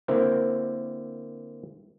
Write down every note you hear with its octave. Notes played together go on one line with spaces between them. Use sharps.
D3 A#3 C4 E4 A#4 C5